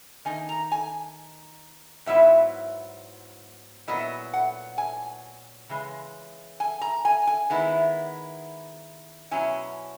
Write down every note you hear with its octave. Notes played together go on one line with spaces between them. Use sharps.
D#3 A#3 D#4 G#5
A#5
G#5
G#2 F#3 B3 E4 E5
A#2 F#3 B3 E4 D#5
F#5
G#5
C#3 E3 G#3
G#5
A#5
G#5
G#5
D#3 G#3 B3 E4
B2 F#3 C#4 E4 G#5